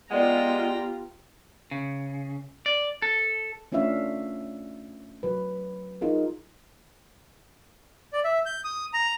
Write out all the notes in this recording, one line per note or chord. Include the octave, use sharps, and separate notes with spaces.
G#3 B3 F4 G4 D5 F#5 G5 A#5
C#3
D5
A4
A3 C#4 D4 F4 E5 F5
F#3 B4
D#4 F4 G#4 A#4
D5
E5
G6
D#6
A#5